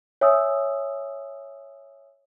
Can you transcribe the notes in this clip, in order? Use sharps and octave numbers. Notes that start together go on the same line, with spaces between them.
C#5 E5 G#5 D#6 E6